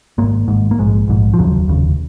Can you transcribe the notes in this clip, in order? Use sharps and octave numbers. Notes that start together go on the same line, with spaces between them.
G#1 G#2 A#3
G#1 G#2
A#3
A#1 G#2 G#3
A#1 G#2
F3
F1 D#2 C#3 F#3
F1 D#2 C#3